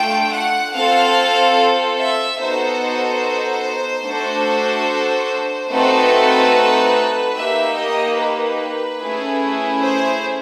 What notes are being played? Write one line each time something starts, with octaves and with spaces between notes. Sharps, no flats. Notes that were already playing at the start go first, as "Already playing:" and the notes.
Already playing: A3 D4 F4 G5
F#5
C4 F4 A4 F5
E5
B3 D#4 F#4 A4 C5
A3 D4 F#4 A4
A3 C4 D#4 F#4 A4 B4
A#3 D#4 G4 E5
D#5
B4
A3 C#4 E4 G#4
C5